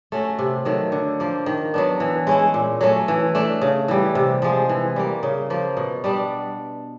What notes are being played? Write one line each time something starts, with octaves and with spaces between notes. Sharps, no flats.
A3 C#4 F#4
C3
D#3 F#3 A3
D3
F3 A#3
D#3
F#3 B3 D4
E3
G#3 C#4 E4
A#2
F#3 A3 C#4
E3
A3 D4
C#3
E3 G3
C3
F3 G#3
E3
G3 A#3
C#3
F3 A#3
B2
G3 B3 D4